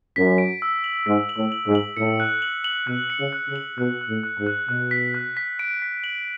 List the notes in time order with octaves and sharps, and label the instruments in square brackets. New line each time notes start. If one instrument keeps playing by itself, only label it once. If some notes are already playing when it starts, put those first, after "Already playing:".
[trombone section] F#2 [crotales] B6
[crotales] D7
E6
F#7
[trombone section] G#2 [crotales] B6
[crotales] F#7
[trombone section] A2
[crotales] F#7
[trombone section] G#2
[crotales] F#7
[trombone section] A2 [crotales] C#7
[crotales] F#6
F#7
F#7
[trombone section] B2 [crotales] F#6
[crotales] C#7
[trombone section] C#3
[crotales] F#6
[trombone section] C#3
[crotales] F#7
[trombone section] B2 [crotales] F#6
[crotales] F#6
[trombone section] A2
[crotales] F#6
[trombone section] G#2
[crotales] F#6
[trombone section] B2 [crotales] F#6
[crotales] B6
F#6
B6
D7
B6
F#7